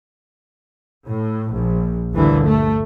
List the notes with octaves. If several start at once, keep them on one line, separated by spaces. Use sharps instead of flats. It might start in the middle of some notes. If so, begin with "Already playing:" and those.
A2
A#1
G1 D2 A#2 D3 E3
A3